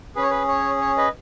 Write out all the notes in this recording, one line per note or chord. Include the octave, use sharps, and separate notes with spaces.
C#4 G#4 B4
C#5
B4
C#5
C#5
B4 D#5